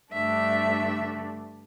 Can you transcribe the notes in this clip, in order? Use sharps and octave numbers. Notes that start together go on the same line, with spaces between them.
G2 D3 A3 D4 E5